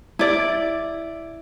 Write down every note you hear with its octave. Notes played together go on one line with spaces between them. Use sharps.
E4 D5